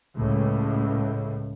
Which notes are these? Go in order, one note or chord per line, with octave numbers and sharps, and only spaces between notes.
C#2 A2